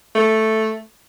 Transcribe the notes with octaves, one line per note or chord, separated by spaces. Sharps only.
A3